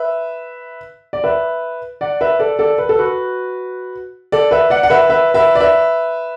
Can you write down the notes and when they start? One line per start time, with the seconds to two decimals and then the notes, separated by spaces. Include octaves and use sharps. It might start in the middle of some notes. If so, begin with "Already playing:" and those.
Already playing: B4 E5
1.13 D5
1.24 B4 E5
2.01 D5 F#5
2.21 B4 E5
2.39 A4 D5
2.59 A4 D5
2.78 B4
2.89 A4
2.99 F#4 B4
4.32 A4 D5
4.51 B4 E5
4.70 D5 F#5
4.83 F#5
4.90 B4 E5
5.09 B4 E5
5.34 B4 E5
5.55 D5
5.60 B4 E5